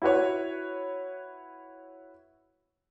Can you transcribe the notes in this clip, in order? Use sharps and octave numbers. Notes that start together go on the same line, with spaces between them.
E4 F#4 B4 C#5